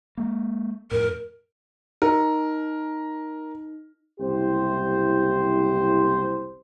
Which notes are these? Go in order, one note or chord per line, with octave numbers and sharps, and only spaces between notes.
G#3 A#3
F2 A2 A#4
D#4 A#4
F#1 C2 E4 G4 C5